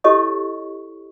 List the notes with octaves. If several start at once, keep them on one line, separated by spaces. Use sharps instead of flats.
E4 G4 A4 C#5 D#5 C#6